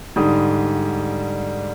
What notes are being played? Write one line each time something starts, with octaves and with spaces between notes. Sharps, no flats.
G#2 D3 G3 D#6